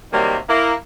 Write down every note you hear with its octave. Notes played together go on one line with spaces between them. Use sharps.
C3 D#3 F#3 G3 A#3
A#3 E4